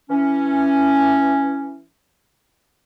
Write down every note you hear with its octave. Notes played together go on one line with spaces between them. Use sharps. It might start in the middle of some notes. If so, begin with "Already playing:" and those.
E3 C#4